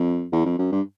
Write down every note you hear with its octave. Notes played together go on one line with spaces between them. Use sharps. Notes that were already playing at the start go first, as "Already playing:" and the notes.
Already playing: F2
E2
F2
F#2
G2